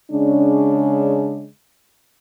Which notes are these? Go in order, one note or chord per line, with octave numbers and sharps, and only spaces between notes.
C#3 G#3 C#4 D4